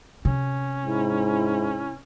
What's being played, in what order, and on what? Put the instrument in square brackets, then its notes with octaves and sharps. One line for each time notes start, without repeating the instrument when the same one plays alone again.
[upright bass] C3 [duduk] C#4
[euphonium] G#2 [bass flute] E4